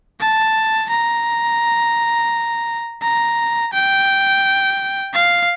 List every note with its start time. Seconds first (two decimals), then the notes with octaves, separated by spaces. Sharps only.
0.20 A5
0.90 A#5
3.02 A#5
3.73 G5
5.13 F5